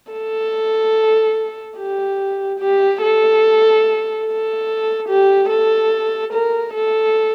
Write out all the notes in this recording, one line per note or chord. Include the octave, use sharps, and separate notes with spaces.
A4
G4
G4
A4
A4
G4
A4
A#4
A4